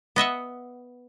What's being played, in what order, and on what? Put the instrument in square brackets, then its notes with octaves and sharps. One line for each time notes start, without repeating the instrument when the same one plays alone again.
[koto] B3 D#5 E5 F#5